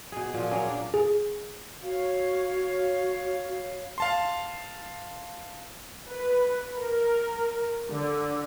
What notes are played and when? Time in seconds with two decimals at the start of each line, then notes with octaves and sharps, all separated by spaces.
0.12 B2 G#4
0.34 A#2 F3
0.50 F#3 A#3 C#4 G#4
0.69 D4
0.94 G#4
1.83 F#4 C#5 F5
3.98 F5 A5 C6
6.10 B4
6.78 A#4
7.91 D3